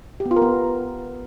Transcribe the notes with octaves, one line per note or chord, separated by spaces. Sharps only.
G4
B3
F4
A#4
B3